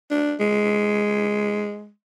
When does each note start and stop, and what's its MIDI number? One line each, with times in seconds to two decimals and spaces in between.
0.11 0.35 62
0.40 1.90 56